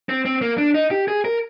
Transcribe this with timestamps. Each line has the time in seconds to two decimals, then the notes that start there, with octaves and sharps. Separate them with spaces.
0.09 C4
0.25 C4
0.42 A#3
0.58 D4
0.75 D#4
0.91 G4
1.08 G#4
1.25 A#4